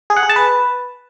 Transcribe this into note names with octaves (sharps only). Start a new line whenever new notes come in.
G#4
F#5
G#4
A5
B4